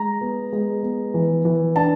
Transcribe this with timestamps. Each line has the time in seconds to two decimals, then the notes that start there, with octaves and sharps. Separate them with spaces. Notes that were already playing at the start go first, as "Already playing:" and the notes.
Already playing: G#3 A#5
0.21 B3
0.53 G#3
0.83 B3
1.14 E3
1.45 E3
1.76 D4 A5